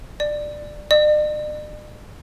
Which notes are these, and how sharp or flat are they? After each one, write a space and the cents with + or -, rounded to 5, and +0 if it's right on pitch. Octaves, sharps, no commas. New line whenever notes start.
D5 +15
D5 +45